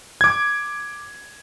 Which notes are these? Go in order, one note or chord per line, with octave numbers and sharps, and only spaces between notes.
D6 G#6